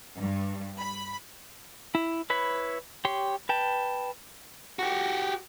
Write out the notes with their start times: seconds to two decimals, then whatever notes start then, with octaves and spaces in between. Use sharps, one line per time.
0.21 G2
0.78 B5
1.95 E4
2.30 E4 B4 C#5 B5
3.05 G4 C#5 C6
3.49 B4 G5 A5
4.79 F#4 G4